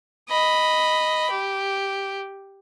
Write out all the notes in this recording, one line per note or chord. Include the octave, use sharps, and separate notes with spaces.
D#5 B5
G4